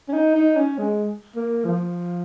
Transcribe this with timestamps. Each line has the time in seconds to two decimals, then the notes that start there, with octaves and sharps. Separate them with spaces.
0.08 C#4
0.13 D#4
0.35 D#4
0.57 C#4
0.78 G#3
1.36 A#3
1.65 F3